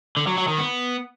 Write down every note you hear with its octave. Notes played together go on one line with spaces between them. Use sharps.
D3
F#3
F#3
D#3
B3